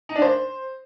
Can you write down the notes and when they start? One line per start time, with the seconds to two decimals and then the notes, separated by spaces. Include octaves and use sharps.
0.09 D#4
0.16 D4
0.22 C5